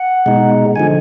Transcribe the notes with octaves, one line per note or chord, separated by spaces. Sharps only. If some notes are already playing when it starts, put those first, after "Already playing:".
Already playing: F#5
B2 G#3 D#4
D3 F3 G#5